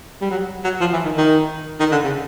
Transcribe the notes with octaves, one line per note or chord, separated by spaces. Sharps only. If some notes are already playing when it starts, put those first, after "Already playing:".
G3
F#3
F#3
F3
E3
D#3
D#3
D#3
D3
C#3